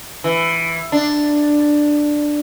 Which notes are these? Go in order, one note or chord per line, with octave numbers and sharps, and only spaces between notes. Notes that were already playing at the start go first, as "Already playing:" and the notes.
E3
D4